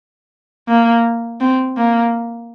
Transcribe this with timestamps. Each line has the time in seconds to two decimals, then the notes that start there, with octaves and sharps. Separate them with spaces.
0.68 A#3
1.41 C4
1.77 A#3